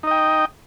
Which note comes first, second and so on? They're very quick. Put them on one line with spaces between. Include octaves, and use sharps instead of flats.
D#4 D#5 G5